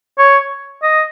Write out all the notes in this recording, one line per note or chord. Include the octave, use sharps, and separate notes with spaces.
C#5
D#5